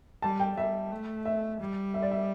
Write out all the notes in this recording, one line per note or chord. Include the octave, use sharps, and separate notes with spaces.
G3 A5
G5
G3 E5
A3
E5
G3
E5
D5
E5